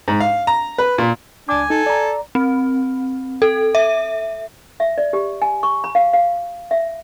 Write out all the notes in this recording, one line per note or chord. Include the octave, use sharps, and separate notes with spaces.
G#2
F5
A#5
B4
A#2
C#2 D4 G#5 D6
D#4 A4
D5 A#5
C4
A4
E5
E5
D5
G4
G#5
C#6
B5
F5
F5
E5